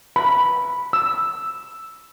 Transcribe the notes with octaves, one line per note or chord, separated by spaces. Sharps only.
B5
E6